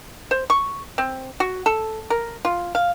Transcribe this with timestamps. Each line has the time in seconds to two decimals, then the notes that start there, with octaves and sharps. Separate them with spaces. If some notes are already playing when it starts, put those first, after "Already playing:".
0.31 C5
0.50 C#6
0.98 C4
1.40 F#4
1.66 A4
2.10 A#4
2.45 F4
2.75 F5